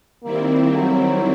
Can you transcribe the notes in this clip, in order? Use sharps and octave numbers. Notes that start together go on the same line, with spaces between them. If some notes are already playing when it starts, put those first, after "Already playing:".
D#3 G3 A#3 C4 E4
F#3